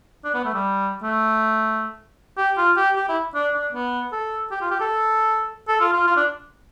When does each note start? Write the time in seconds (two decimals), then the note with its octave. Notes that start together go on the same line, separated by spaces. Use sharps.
0.24 D4
0.34 B3
0.44 A3
0.54 G3
1.03 A3
2.37 G4
2.57 F4
2.77 G4
2.96 G4
3.09 E4
3.35 D4
3.54 D4
3.73 B3
4.12 A4
4.51 G4
4.61 F4
4.71 G4
4.80 A4
5.68 A4
5.80 F4
5.93 F4
6.07 F4
6.17 D4